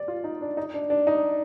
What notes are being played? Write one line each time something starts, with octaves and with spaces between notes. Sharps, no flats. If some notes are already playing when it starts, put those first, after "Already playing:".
Already playing: D5
F4
D#4
D4
D#4
D4
D4
D#4